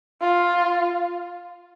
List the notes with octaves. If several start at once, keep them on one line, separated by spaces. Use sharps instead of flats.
F4